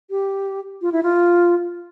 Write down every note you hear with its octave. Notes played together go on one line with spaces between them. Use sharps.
G4
F4
E4
F4